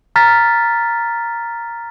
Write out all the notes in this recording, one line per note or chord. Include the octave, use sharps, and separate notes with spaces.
A#5 F6 A6 B6